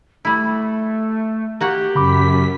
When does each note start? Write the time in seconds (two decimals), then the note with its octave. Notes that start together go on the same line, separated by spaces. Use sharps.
0.25 G3 A3 E4
1.61 A#3 F#4 G4 F#5
1.95 F#2 C#3 B5 D6 B6